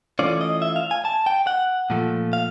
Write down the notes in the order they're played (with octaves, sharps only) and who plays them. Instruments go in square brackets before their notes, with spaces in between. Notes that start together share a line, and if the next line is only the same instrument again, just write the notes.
[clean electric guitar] E3 A3 C#4 F4 D5
D#5
E5
F5
G#5
A5
G5
F#5
A#2 F3 A3
F5